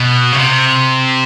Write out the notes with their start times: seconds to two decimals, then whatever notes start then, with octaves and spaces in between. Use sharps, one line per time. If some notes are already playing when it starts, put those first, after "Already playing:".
Already playing: B2
0.32 C#3
0.37 C3